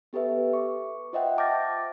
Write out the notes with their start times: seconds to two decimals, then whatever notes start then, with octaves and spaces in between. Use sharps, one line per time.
0.13 B3 G4 A4 B4 E5
0.53 C#6 D6
1.13 F4 C5 D#5 E5 F#5 G5
1.38 A5 D6 F6 G6 A6 A#6